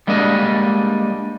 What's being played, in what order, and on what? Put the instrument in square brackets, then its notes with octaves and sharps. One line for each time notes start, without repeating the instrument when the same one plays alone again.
[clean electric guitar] G3 G#3 A#3 D4 D#5